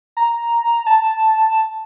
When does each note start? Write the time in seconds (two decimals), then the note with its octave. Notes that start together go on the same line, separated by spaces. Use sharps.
0.17 A#5
0.87 A5